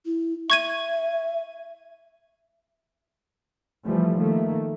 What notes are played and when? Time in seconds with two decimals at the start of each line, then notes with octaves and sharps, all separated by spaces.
0.05 E4
0.50 E5 C#6 G#6 D#7
3.85 E3 F3 G3 A3
4.17 D#3 A3 A#3